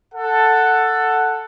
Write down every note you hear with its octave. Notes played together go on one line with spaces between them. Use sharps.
A4 F#5